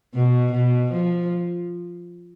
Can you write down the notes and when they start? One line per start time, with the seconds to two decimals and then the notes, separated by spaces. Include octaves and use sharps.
0.14 B2
0.53 B2
0.92 F3